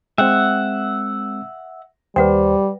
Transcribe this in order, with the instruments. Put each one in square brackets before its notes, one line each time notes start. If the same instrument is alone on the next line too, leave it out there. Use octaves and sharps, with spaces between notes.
[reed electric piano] G#3 C4 [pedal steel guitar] E5 F#5 [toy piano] G5
[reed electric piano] D#2 C5 [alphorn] G3 [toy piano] B4 F#5 G5